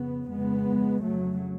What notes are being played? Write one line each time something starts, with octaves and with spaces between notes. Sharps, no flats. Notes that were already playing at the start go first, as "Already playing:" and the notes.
Already playing: F2 C#3 B3
F2 C#3 G#3 B3
F2 C#3 F#3 A3